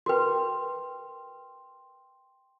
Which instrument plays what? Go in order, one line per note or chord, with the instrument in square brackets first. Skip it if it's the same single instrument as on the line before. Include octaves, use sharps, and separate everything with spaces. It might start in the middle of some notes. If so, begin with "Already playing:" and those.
[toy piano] F#4 A#4 B4 [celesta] G5 C6